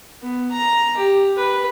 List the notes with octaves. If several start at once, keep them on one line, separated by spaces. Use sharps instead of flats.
B3
A#5
G4
B4